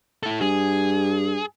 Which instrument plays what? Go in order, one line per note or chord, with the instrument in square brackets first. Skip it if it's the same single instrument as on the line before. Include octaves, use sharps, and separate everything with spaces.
[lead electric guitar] E4 A4
[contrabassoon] G2 [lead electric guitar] G#4